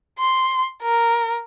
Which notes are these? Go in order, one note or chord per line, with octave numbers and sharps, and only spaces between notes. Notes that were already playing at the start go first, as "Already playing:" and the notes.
C6
A#4